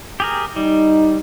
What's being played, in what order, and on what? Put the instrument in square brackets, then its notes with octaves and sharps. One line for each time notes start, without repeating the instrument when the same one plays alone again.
[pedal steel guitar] G4 G#4 A#4
[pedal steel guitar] G3 [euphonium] D#4